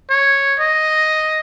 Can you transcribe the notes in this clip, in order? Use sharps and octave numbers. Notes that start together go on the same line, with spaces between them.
C#5
D#5